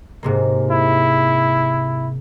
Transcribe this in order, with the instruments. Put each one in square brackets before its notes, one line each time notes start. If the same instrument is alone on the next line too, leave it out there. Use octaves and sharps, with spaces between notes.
[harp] G#2 C3 A#3
[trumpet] E4